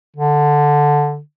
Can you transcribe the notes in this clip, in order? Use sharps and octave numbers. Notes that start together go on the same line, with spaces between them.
D3